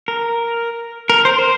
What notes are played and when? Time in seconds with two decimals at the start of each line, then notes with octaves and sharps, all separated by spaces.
0.08 A#4
1.10 A#4
1.25 C5
1.39 C5